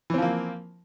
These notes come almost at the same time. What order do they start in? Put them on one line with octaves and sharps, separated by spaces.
E3 C4 F3 A#3